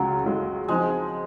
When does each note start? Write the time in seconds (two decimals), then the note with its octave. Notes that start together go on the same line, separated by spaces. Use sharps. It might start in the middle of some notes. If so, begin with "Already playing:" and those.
Already playing: C#2 C#3 F#3 G#3
0.24 C#2 C#3 G#3
0.68 F3 G#3 C4 D#4